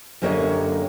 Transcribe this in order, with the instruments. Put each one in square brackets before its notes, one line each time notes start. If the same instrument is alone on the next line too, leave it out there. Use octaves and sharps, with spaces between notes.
[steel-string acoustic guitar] F#2 D3 A#3 G4 C#5 D#5